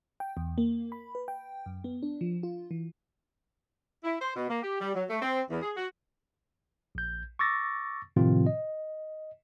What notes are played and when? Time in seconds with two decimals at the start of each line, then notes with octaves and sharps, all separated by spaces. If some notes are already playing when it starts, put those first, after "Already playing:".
0.20 G5
0.37 E2
0.58 A#3
0.92 B5
1.15 B4
1.28 G5
1.66 F#2
1.84 B3
2.03 D4
2.21 F3
2.43 F4
2.71 E3
4.04 E4
4.21 C5
4.36 B2
4.49 A#3
4.63 G4
4.81 G3
4.95 F#3
5.10 A3
5.22 C4
5.50 E2
5.62 G#4
5.77 F#4
6.95 A#1 G6
7.39 C#6 D6 E6 A6 A#6
8.16 A2 C3 D#3 F3 C4 F4
8.46 D#5